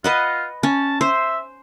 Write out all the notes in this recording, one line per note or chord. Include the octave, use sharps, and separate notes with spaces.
F4 B4 D#5 F#5
C#4 A5
C5 E5